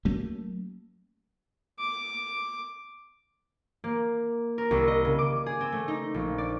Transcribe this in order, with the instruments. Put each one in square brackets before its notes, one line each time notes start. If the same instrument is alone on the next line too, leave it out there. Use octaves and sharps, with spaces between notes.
[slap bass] F#3 A3 A#3 C#4
[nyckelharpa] D6
[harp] A#3
A#4
C2
D#5
C#3
D6
G#4
C4
A3
D#4
A#1
D5